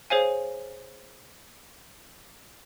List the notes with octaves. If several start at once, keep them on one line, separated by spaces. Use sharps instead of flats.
G#4 C5 C#5 F5 G#5